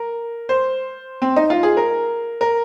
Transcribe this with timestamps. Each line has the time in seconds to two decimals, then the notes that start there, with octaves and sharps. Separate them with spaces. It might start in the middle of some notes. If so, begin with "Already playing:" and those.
Already playing: A#4
0.49 C5
1.22 C4
1.36 D#4
1.50 F4
1.63 G#4
1.77 A#4
2.41 A#4